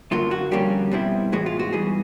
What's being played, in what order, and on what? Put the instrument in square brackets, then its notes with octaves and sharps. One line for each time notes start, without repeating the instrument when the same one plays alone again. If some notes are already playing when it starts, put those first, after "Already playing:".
[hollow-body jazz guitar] F#2 D3 F#3 A#3 F4
F#4
F2 D3 G3 A#3 C#4 G4
B2 G3 C4 E4
A2 E3 G#3 B3 F#4
F4
F#4
G#2 E3 G3 G#4